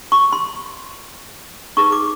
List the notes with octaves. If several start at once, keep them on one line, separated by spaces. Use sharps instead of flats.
C#6
C6
D#4 G#4 B4 C#6
D6